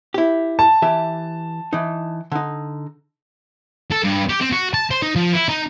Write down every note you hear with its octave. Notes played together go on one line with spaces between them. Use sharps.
E4 G4
A5
E3 G4 E5
E3 D#4
D3 D#4
A4
G2
G4
C4
F#4
A5
C5
D#4
F3
E4
D#4